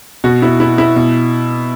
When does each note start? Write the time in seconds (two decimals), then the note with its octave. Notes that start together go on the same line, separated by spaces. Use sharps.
0.24 B2 F#4
0.42 E4
0.60 E4
0.78 E4
0.96 B2